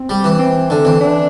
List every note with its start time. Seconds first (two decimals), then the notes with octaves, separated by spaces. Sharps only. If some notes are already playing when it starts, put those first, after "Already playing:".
Already playing: C4
0.09 G3
0.24 E3
0.39 C4
0.70 D3 D4
0.85 E3 C4
1.01 D4